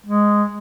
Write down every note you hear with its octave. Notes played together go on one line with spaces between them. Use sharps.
G#3